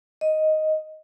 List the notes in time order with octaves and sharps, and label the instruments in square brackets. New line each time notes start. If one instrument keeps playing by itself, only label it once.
[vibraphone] D#5